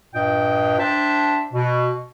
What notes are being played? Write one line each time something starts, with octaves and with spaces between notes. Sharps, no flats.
G2 A#2 D#5 G5
D4 C5 E5 G5 A5
B2